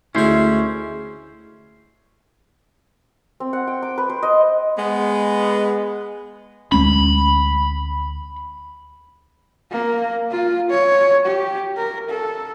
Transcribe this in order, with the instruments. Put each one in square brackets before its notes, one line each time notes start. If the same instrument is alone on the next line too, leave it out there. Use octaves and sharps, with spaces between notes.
[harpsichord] D2 G#3 [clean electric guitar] C#4 C5 [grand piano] E4
[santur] C4
F#5
G5
D6
B4
C5
D#5
[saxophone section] G#3 B3
[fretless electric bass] D2 G#3 C#4 [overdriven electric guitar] B5
[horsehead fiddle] A#3
F4
C#5
G4
A#4
A4